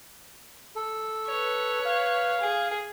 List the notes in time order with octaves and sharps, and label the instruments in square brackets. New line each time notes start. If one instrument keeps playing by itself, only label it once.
[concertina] A4
[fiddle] B4 C#5
[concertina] F5
[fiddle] G#4